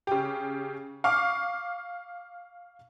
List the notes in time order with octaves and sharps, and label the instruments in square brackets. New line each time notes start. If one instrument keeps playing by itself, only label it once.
[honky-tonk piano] C#3 G4
F5 C#6 D6 F6